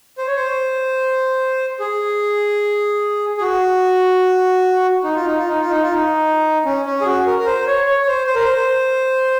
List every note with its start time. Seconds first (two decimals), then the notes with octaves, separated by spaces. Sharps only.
0.18 C5
0.27 C#5
0.36 C5
1.80 G#4
3.38 G#4
3.41 F#4
5.04 D#4
5.15 F4
5.26 D#4
5.38 F4
5.49 D#4
5.60 F4
5.71 D#4
5.83 F4
5.94 D#4
6.65 C#4
6.85 C#4
7.01 G#4
7.06 F#4
7.27 A#4
7.39 A#4
7.46 C5
7.67 C#5
7.87 C#5
8.02 C#5
8.07 C5
8.27 C5
8.35 A#4
8.44 C5